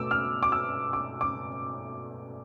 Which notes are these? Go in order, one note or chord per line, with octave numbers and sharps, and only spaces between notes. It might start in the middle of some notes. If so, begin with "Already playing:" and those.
Already playing: B2 A3 D6 E6
F6
D6
E6
D6
D6